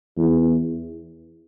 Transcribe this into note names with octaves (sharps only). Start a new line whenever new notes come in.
E2